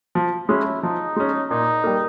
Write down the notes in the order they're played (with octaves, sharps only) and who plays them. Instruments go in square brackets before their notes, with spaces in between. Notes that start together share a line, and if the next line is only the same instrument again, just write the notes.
[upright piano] F3
[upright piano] G#3 C#4 [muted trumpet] E4
[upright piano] F3 [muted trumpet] D#4
[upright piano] G#3 C#4
[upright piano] A#2 [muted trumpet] D#4
[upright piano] G3 A#3